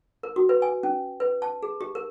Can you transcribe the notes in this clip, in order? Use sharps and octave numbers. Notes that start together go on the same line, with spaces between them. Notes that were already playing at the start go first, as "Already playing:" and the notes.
A#4
F#4
B4
G#5
C#4
B4
A5
G#4
G4
A#4